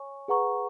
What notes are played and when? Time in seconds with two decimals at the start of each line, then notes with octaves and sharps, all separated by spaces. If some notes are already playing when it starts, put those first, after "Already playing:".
Already playing: C#5 G#5 C#6
0.28 G#4 B4 F#5 A#5 C#6